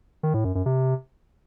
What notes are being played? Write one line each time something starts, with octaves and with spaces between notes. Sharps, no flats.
D#3
A2
F#2
F#2
C3